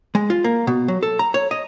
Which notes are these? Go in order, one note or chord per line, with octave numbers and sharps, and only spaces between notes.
G#3
F4
A#3
B2
F#3
A4
A#5
C#5
D#5